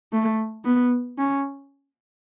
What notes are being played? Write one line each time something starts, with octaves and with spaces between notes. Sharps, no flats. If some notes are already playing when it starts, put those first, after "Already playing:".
A3
B3
C#4